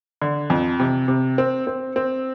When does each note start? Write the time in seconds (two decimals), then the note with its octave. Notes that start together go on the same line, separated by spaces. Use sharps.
0.22 D3
0.50 F2
0.80 C3
1.08 C3
1.38 C4
1.67 C4
1.96 C4